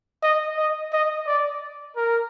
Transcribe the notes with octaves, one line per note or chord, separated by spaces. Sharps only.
D#5
D#5
D#5
D5
A#4